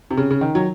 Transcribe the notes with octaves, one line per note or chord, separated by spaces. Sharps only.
C3
C#3
C#3
D#3
F#3